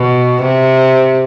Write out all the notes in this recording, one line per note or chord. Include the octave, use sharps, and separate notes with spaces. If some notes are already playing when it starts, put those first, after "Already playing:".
Already playing: B2
C3